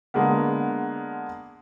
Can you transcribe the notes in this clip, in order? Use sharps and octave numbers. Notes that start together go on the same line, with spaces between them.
D3 G#3 A#3 B3